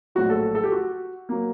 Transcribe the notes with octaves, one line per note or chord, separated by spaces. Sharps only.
A#1 A2 F#3 F#4
A4
A4
G4
F#4
F#3 A#3